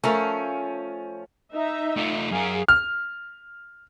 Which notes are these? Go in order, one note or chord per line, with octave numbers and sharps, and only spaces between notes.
F3 A3 C#4 A#4 F5
D#4 E5
A3 F4
F#2 G#4 A#4 F5
F6